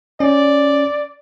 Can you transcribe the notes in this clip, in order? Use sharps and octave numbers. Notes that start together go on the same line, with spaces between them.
C#4 D5